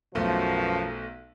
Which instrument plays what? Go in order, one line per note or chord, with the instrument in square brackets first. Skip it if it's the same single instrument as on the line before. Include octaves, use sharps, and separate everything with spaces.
[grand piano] B1 A3 [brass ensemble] F#2 B2 F3